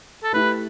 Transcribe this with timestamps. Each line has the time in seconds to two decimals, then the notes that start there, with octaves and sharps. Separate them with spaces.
0.23 A4
0.33 A3 E4 G4 B4